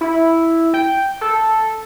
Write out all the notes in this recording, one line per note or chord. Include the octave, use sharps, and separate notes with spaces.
E4
G5
A4